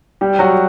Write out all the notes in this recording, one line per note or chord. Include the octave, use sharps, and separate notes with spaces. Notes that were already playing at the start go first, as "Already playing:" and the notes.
G3 G4
F#3 F#4